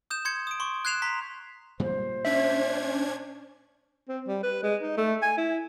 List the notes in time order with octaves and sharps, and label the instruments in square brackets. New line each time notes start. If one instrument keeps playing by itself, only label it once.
[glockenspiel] D#6 G6 E7
C6 G6 G#6 C#7
D#6 D7
C6 C#6
F#6 G#6 C7 E7 F7
A#5 C6 B6
[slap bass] A#2 G3 G#3 [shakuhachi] C5
[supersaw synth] C#4 D4 G#6 [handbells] E5
[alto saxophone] C4
G3
B4
G#3
D#4
A3
G#5
E4